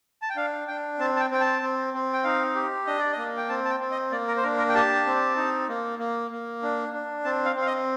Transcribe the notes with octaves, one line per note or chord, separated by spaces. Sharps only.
A5
G5
D4 F5
D4 G5
C4 A5
A5
G5
C4 G5
A5
C4
C4
G5
D#4 F5
G4
D4 D#5
D5
D#5
A#3
G5
C4 A5
A5
G5
C4
D#5
A#3 D5
A#4
C5
D4 A#4
A#4
G5
G4 A5
C4
D#4
A#3
A#3
A#3
D4
D4
C4 A5
F5
C4
F5
D#5